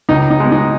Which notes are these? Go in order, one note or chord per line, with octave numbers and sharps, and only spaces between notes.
C#2 D#4
D#4
B2 G#3
D#4